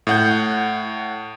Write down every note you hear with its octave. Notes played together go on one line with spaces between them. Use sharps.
A2 F#5 G6